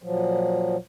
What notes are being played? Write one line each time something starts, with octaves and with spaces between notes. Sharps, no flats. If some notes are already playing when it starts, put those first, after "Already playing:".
A#2 F3 F#3